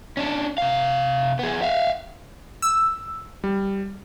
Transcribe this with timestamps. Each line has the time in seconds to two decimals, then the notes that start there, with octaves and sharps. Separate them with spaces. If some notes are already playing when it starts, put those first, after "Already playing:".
0.17 C#4 D4
0.58 C3 F5
1.39 B3 G#4
1.62 E5 F5
2.62 E6
3.44 G3